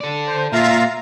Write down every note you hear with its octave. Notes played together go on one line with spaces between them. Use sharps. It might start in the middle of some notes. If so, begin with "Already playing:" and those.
A4 D5
C5
A#2 F4 E5 F5 A#5